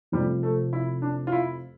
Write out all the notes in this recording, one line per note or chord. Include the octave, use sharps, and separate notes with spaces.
F1 F2 C3 F3 G3 C4
A3
E4
D4
F4
E4